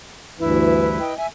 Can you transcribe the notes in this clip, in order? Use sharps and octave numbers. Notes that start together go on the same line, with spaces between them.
D2 G2 E3 E4 B4
D#5 G5
E5 G#5